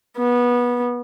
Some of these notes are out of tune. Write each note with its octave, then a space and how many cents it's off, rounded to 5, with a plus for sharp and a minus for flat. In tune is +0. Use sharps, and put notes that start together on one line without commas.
B3 -20